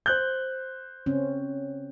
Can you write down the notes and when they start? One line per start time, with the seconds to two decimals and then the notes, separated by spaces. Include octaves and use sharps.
0.06 C5 F#6 G6
1.06 C#3 C4 C#4